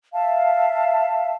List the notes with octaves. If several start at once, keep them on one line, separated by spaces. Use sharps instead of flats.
E5 F5 A5